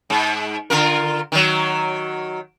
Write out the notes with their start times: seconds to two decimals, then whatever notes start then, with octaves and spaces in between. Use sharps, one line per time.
0.10 G#2
0.70 D3 F4 A#4
1.32 D#3 F#3